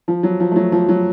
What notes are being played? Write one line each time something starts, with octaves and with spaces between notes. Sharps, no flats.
F3
F#3
F3
A3
F#3
F3
F#3